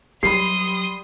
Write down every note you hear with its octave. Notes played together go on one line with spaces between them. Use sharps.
F#3 G3 B5 C6 D#6 C7